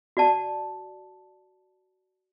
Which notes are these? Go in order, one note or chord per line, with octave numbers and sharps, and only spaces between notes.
F#4 D5 A5